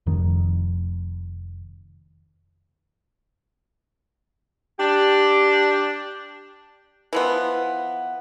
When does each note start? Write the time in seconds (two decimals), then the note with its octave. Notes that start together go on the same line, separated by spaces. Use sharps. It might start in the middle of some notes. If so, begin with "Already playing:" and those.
0.06 F1 F2 D#3
4.79 D4 G4
7.13 E3 F3 B3